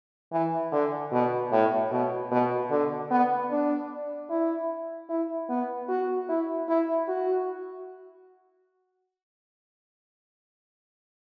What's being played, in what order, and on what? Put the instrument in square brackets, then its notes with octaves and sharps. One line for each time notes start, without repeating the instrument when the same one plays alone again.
[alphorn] E3
D3
B2
A2
B2
B2
D3
B3
D4
E4
E4
B3
F#4
E4
E4
F#4